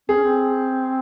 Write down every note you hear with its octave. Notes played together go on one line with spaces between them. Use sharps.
C4 G#4
C#4
C4